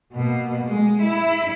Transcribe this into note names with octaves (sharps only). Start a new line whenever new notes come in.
B2 A#3
G#3
E4